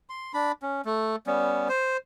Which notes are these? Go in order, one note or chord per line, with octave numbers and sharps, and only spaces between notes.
C6
D4 B5
C#4
A3
G3 B3 C#4
C5